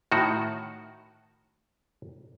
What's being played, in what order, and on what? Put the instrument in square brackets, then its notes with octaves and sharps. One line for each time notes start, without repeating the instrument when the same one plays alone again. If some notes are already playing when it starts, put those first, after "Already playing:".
[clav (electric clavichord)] A2 D#3 F#4